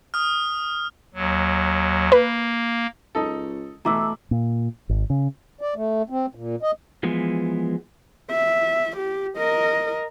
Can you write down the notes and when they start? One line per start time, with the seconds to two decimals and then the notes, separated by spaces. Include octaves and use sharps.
0.14 D#6 F6
1.14 D#2 F#3
2.12 A#3 B4
3.15 C#2 D#4 A4
3.85 B2 E3 A3 E4 A#5 D6 E6
4.31 A#2
4.89 G#1
5.10 C#3
5.61 D5
5.76 A3
6.10 C4
6.35 A#2
6.62 D#5
7.03 E3 F3 G#3 B3
8.31 E5
8.97 G4
9.38 A#4 D#5